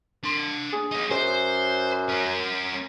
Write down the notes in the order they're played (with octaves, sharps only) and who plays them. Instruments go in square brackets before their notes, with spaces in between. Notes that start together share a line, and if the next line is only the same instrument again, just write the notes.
[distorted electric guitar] D4 C6
[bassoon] G#4
[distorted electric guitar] B3 D#4
[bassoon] F#2 [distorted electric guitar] C5
[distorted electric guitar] C#4 A#4